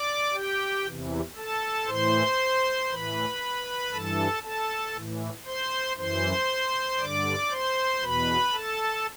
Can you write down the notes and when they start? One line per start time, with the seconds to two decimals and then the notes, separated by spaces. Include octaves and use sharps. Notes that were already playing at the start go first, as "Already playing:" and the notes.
Already playing: D5 D6
0.33 G4 G5
0.85 E2 C3 E3
1.36 A4 A5
1.87 A2 E3 C5 C6
2.89 A2 E3 B4 B5
3.92 G2 E3 A4 A5
4.43 A4 A5
4.94 A2 E3
5.45 C5 C6
5.97 F#2 E3 C5 C6
6.99 G2 D3 D5 D6
7.50 C5 C6
8.01 E2 B2 B4 B5
8.52 A4 A5